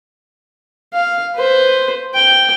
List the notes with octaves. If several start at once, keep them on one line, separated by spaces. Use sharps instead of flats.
F5
B4 C5
G5